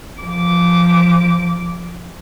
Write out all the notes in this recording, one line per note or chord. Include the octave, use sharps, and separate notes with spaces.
F3 D6